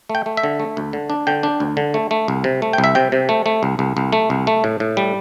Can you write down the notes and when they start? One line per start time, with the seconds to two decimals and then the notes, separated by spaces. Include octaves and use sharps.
0.10 A3
0.15 G5
0.26 A3
0.37 E5
0.43 D3
0.59 A3
0.77 D2
0.93 D3
1.10 D4
1.27 D3 G5
1.43 D4
1.60 D2
1.77 D3
1.94 A3
2.11 A3
2.28 C2
2.44 C3
2.62 A3
2.73 C2 G5
2.84 E5
2.95 C3 G5
3.12 C3
3.29 A3
3.46 A3
3.63 C2
3.79 C2
3.97 C2
4.13 A3
4.30 C2
4.47 A3
4.64 A2
4.80 A2
4.97 G3